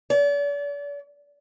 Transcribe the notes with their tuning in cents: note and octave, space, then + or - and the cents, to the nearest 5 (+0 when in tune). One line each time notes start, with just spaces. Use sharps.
D5 -40